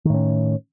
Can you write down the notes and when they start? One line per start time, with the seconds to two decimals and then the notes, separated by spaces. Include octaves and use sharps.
0.05 D#3
0.10 A2
0.14 C#4